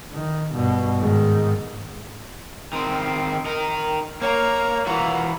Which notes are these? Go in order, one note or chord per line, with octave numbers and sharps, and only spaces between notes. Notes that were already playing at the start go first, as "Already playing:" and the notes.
D#3
G2 B2
G#2 D#3
D#3 C4
D#4 A#4
A#3 C#5 A#5
E3 F4 F#4 A#5